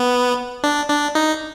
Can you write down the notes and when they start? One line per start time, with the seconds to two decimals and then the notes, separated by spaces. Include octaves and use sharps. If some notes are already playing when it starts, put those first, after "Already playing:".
Already playing: B3
0.64 D4
0.89 D4
1.15 D#4